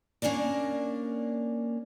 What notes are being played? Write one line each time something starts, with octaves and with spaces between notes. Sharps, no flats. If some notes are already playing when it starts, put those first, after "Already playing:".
A#3 C#4 D4 A#4 D5